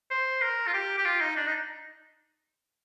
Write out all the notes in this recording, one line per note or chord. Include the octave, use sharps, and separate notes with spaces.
C5
A#4
F4
G4
G4
F4
D#4
D4
D#4